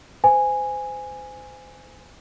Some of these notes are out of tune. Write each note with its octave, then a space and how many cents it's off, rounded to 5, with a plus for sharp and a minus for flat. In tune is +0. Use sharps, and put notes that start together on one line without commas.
C5 -30 G#5 -10